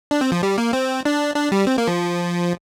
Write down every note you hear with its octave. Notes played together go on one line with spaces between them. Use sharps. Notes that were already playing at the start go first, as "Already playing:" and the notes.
D4
C4
F3
G3
A#3
C4
D4
D4
G3
C4
A#3
F3